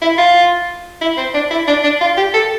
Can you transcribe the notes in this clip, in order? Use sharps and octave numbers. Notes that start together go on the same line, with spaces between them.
E4
F4
E4
C4
D4
E4
D4
D4
F4
G4
A4